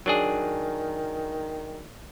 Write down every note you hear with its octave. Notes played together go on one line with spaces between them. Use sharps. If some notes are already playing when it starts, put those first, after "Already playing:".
D#3 F#3 D4 G#4